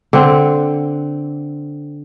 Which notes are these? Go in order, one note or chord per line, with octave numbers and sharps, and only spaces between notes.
D3 C4